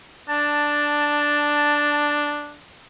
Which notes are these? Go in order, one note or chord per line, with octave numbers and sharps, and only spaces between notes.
D4 A5